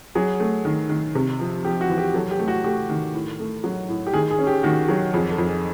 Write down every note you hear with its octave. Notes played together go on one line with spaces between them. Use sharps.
F#3 G#4
A3
D#3
D#3
C3
F3
F3 G4
F#4
E2
G4
F#3 A4
G4
A3
F#4
A3 G4
D#3
A2
A3
F#3
A2
G4
D#3 G#4
G#4
C#4
G4
D#3 F#4
F#3 G4
F2 G#4
A4
F2
G#4